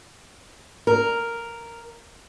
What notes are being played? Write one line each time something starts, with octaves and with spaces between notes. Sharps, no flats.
A#4